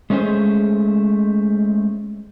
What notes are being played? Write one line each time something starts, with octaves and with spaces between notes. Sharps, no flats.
G#3 A3 C#4 G#4 C5